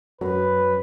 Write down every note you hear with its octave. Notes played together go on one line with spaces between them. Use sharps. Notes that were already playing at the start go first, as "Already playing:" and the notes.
F#2 F#3 B4